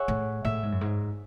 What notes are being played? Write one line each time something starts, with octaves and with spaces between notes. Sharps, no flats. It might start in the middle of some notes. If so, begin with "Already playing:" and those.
Already playing: G#4 C#5 E5 F#5
A2
A2 E5
G#2
F#2
G#2